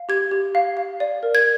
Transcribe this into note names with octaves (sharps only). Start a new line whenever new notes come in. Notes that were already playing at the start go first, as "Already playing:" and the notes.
Already playing: F5
G4 G#6
G4
F5
F5
D5
A#4
G#6